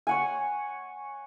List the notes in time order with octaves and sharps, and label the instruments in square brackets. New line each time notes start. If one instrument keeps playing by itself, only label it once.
[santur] C#5 F#5 G#5